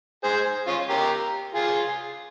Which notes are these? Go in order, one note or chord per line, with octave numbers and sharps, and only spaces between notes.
G#4 C5
C#4 F4
G4 A#4
F4 G#4